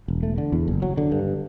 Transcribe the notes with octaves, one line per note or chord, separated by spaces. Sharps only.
E1
A3
D3
E2
F#1
F#3
D3
G2